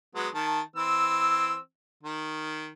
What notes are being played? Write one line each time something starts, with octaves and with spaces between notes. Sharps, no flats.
F#3 G#3 B3
D#3 A5
E3 C4 E6
D#3